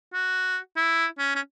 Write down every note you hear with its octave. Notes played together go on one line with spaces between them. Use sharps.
F#4
E4
C#4
C#4